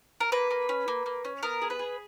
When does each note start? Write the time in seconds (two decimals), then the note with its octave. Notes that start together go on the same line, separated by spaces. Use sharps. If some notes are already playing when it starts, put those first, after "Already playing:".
0.20 A#4
0.32 A#3 B4
0.51 A#3
0.69 C#4
0.88 A#3
1.06 A#3
1.25 C#4
1.43 B3 A#4
1.62 G#4
1.70 B4
1.79 G#4